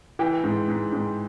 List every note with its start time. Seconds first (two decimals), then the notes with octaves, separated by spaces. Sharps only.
0.19 E3 G5
0.44 G#2
0.68 G#2
0.92 G#2